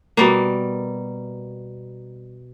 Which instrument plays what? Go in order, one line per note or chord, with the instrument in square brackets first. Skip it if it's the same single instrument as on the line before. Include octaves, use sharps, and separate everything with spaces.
[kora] B2 G3 A#3